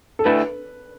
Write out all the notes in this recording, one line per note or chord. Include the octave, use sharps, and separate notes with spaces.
A4
D3 A3 E4 B4